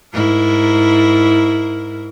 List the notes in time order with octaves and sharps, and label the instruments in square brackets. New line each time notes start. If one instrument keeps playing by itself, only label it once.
[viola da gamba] G#2 E4 A#4